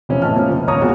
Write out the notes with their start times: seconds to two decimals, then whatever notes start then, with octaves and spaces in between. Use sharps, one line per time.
0.09 E1 C3 F3 C#4
0.22 A2 E3 D#5 A5 F6
0.36 F3 A#3 C#4
0.51 F1
0.67 D#1 D#2 C#5 A#5 D#6
0.81 A#3 F4 F#4 G#4